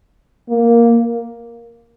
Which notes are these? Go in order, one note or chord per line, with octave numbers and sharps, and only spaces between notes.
A#3